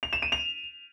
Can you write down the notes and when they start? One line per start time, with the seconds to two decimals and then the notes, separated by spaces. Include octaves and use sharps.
0.03 F7
0.13 E7
0.22 D#7
0.32 F7